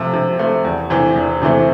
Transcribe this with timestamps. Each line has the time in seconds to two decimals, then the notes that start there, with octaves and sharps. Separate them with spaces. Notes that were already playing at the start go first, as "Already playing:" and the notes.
Already playing: C3 F3 A3 C4
0.13 C3
0.39 F3 A3 C4
0.64 E2
0.90 C3 E3 A3 C4
1.16 E2
1.42 C3 E3 A3 C4